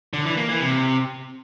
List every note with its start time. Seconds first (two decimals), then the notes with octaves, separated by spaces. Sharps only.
0.13 D3
0.25 E3
0.37 A#3
0.49 E3
0.61 C3